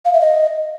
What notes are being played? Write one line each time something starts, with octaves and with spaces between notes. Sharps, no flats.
F5
E5
D#5